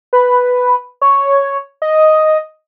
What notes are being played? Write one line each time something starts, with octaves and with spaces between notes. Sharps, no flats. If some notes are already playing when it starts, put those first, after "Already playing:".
B4
C#5
D#5